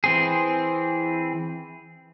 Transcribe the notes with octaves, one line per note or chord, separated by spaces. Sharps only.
E3 C4 G#4